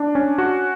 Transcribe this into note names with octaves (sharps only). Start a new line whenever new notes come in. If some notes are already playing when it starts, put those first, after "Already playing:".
Already playing: D4
C#4
F#4